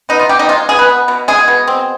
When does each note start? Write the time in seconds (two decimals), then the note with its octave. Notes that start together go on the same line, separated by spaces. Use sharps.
0.09 B3 D#4
0.19 F4
0.29 B2 G4
0.39 D#4
0.49 G#3 F4
0.69 B2 G#4
0.79 B4
0.89 B3
1.08 B2
1.28 G#3 G#4
1.48 B2
1.68 C4